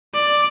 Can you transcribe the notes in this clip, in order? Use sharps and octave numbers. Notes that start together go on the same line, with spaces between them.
D5